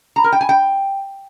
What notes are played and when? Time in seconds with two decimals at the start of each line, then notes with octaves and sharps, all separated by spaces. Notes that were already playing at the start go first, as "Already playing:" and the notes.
0.16 A#5
0.24 A#4
0.32 G5
0.41 G#5
0.49 G5